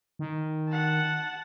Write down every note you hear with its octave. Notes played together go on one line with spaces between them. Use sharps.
D#3
F#5 A5